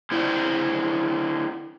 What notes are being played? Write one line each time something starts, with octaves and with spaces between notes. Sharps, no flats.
D3 E4 C5 D5